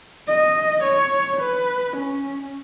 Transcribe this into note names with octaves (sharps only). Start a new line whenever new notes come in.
D#5
C#5
B4
C#4